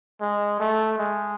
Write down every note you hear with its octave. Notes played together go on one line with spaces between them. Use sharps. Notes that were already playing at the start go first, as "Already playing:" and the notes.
G#3
A3
G#3